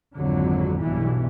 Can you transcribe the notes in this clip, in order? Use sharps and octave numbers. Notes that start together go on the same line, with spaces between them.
G#1 F2 D3 F#3
B1 G2 B2 E3